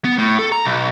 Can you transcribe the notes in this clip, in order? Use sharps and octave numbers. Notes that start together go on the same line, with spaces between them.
B3
A2
A4
A#5
B1